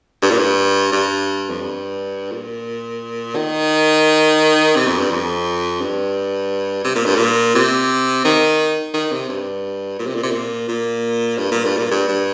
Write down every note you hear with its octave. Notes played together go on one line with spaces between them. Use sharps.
G2
A#2
G2
G2
F2
G2
A#2
D#3
C3
F2
G2
F2
G2
C3
A#2
G2
A#2
C3
D#3
D#3
C3
G2
A#2
C3
A#2
C3
A#2
A#2
G2
A#2
G2
A#2
G2
G2